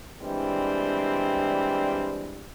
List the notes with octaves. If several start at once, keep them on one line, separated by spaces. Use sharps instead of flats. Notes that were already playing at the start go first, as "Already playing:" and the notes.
E3 G3 G#3 C4 D4